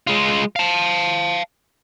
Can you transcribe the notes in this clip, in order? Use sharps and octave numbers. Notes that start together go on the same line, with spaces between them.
G#3 F4
F5 A5